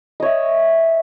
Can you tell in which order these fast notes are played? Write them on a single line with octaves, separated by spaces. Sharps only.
D#5 C#5 E5